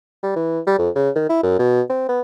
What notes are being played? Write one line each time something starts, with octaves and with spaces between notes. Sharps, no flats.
G3
E3
G3
F2
C#3
D#3
E4
F#2
B2
C4
B3